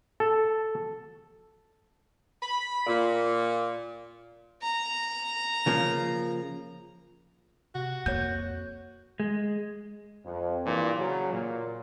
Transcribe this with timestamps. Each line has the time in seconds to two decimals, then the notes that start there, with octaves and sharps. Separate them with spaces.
0.20 A4
2.42 B5
2.87 A#2
4.62 A#5
5.66 C#3 F3 A#3
7.75 C3 F#4
8.06 F2 A#3 C#5 G6
9.20 G#3
10.26 F2
10.66 G2 A#2 E3
10.98 C#3 F#3
11.32 A#2